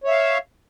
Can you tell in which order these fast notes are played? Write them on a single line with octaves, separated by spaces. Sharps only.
C#5 E5 F5